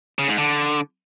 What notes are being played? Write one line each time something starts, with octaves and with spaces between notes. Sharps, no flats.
C#3
G#2
D3